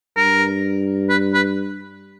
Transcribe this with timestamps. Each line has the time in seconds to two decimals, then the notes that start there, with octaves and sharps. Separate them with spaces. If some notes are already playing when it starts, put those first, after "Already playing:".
0.17 G2 A#4
1.10 B4
1.34 B4